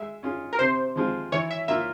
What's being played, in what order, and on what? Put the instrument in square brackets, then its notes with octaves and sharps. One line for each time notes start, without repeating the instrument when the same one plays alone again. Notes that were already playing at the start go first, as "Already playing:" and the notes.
Already playing: [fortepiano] G#3 [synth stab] E5
[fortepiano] C#4 F4 G#4
[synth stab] A#4
[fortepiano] C3 [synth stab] C5
[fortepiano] F3 G#3 C4 F4
[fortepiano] E3 [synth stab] C#5
[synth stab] E5
[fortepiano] A#3 F4 [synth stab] E5